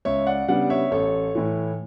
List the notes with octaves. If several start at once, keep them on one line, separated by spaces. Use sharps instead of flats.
C#2 C#5 E5
D5 F#5
C#3 G3 B3 D4 D5 F#5
C#5 E5
A1 A4 C#5
A2 E3